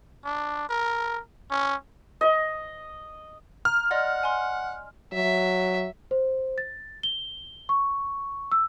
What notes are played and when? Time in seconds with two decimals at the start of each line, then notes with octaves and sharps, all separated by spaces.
0.25 D4
0.69 A#4
1.51 C#4
2.21 D#5
3.65 A#5 F6
3.91 D5 D#5 F#5 C6
4.23 G#5 C6
5.13 F#3 E5
6.11 C5
6.58 A6
7.03 G7
7.69 C#6
8.52 E6